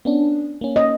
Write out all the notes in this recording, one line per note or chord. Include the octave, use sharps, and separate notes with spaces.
B3 C#4 D4
A#3 C#4
D#5